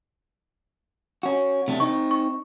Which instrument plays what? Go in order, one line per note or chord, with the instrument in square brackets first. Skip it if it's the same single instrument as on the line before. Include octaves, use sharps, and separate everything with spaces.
[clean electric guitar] C#4 F#4
C3 A3 D4
[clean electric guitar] C4 D#4 [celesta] C#6
[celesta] C#6